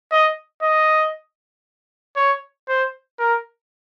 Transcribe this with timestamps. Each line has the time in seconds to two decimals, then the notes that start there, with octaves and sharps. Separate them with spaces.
0.12 D#5
0.63 D#5
2.16 C#5
2.68 C5
3.19 A#4